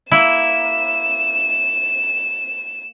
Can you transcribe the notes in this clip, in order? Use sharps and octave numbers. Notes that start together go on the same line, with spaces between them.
A#3 E4 E7